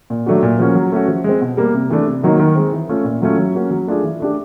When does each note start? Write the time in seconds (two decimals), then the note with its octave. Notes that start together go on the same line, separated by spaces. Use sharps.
0.10 A#2
0.26 F#3 A3 D4 F#4
0.43 A#2
0.59 F3 A#3 C#4 F#4
0.75 F#3
0.92 A3 C#4 F#4
1.08 F3
1.24 G#3 C4
1.41 B2
1.57 G3 A#3
1.74 C3
1.90 E3 A3 D4
2.07 C3
2.23 D#3 F#3 A#3 D#4
2.39 D#3
2.56 G#3 C4
2.72 E3
2.89 A3 C#4 F4
3.05 A#2
3.22 F#3 A3 C#4 F4
3.38 F#3
3.54 A#3 C#4 F#4
3.71 F#3
3.87 A3 D4 F4 G#4
4.03 E3
4.20 A3 D4 G4